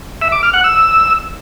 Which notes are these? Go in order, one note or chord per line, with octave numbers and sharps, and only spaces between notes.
E5
D6
F6
F#5
E6